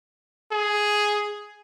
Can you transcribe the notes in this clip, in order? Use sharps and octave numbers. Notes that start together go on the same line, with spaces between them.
G#4